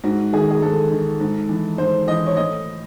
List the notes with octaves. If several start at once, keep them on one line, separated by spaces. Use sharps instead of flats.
G#2 F#4
D#3 G#4
G#4
G#2 A4
D#3
G#2
E3
G#2 C5
E3 D#5
C#5
A2 D#5